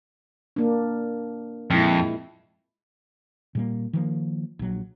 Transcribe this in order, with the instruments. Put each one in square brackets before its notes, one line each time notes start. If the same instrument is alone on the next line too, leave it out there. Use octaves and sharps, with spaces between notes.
[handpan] A#3 D4
[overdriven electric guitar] F2 [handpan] A#2 G#3 E4
[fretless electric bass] A#2 G3 A#3
D#3 F3 A#3
A#1 F#3